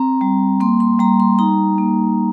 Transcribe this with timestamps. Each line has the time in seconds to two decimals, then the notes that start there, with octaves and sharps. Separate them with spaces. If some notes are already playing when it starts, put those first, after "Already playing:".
Already playing: C4 A#5
0.21 G3
0.60 A#3 C6
0.80 C6
0.99 G3 A#5
1.20 C6
1.39 D#4 A#5
1.78 A#3